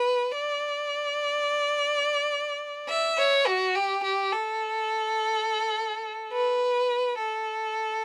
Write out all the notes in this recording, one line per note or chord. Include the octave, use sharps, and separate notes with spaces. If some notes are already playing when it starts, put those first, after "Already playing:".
Already playing: B4
D5
E5
C#5
F#4
G4
G4
A4
B4
A4